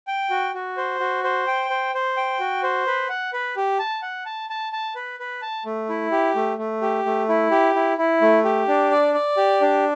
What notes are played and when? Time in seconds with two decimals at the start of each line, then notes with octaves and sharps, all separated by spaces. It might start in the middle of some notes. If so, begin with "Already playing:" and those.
0.07 G5
0.30 F#4
0.54 F#4
0.77 C5
1.00 F#4
1.24 C5
1.47 G5
1.70 C5
1.94 C5
2.17 G5
2.39 F#4
2.63 C5
2.87 B4
3.09 F#5
3.33 B4
3.56 G4
3.79 A5
4.03 F#5
4.26 A5
4.50 A5
4.73 A5
4.96 B4
5.20 B4
5.42 A5
5.65 A3
5.89 E4
6.12 G4
6.35 A3
6.58 A3
6.82 G4
7.06 A3
7.29 E4
7.51 G4
7.75 E4
7.98 E4
8.21 A3
8.44 G4
8.68 D4
8.91 D5
9.14 D5
9.37 G4
9.61 D4